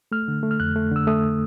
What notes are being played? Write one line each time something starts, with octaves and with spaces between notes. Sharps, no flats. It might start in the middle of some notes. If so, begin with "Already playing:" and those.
A3 F6
D3
A3
F6
F2 F#6
A3
D3 E6
A3 D#6